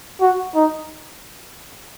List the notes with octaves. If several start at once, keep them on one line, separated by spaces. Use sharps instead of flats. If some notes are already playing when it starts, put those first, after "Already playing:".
F#4
D#4